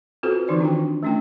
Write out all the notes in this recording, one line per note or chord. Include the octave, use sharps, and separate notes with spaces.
C4 F4 F#4 A4 B4 C5
D#3 E3 C4 D#4 C5 D5
D4 F4 F#4 G5
A3 C#4 D4 E4 G5